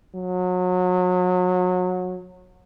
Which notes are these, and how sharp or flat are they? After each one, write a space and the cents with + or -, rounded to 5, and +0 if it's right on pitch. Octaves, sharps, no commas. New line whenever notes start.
F#3 -30